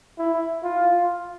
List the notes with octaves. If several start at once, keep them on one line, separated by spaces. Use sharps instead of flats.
E4
F4